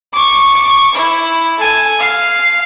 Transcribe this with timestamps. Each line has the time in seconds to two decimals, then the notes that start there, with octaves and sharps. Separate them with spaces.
0.13 C#6 D6
0.95 E4
1.59 A4 G#5
1.99 F5